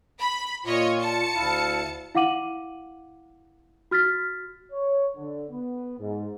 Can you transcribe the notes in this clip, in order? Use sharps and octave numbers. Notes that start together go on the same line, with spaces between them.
B5
A#2 F4 C#5 D#5 C#7
A5 C#7
D2 E4 F5
E4 F5 F#5 D6 D#7 F#7
F#4 F6 A6 B6
C#5
D3
B3
G#2